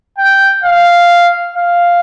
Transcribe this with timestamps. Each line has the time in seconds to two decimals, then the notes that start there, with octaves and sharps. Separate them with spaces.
0.18 G5
0.64 F5
1.56 F5